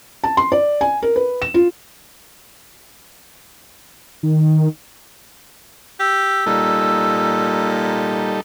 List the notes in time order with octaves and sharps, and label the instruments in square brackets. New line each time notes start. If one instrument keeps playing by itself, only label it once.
[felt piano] A5
C6
D5
G#5
A#4
B4
E7
F4
[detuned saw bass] D#3
[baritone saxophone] G4 [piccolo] E6
[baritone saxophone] A#2 [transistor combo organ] G3 D#4 A4